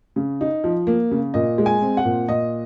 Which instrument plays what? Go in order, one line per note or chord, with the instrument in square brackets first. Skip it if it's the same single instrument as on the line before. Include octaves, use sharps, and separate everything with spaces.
[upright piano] C#3
D#4
F3
A#3
C#3
A#2 D#5
G#3
G#5
C4
F#5
A#2
A#2 D#5